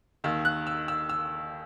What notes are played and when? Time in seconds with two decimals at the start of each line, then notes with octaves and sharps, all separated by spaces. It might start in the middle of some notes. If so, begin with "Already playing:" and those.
0.24 D#2 D#3 E6
0.45 F#6
0.67 E6
0.88 E6
1.09 E6